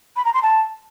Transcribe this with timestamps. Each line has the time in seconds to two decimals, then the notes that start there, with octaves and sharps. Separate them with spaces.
0.16 B5
0.25 A#5
0.33 C6
0.42 A5